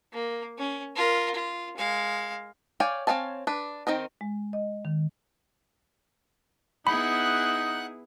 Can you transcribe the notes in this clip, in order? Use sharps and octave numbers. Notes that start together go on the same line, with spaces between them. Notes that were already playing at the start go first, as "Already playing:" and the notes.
A#3
C#4
F4 A#4
F4
G#3 F5
C#5 D5 F5 G5 G#5
C4 C#5 F5 G#5 A5
D4 B4
D#3 C4 D#4 A#4
G#3
D#5
D#3
B3 D#4 E4 G#4 F#5 B5 F#6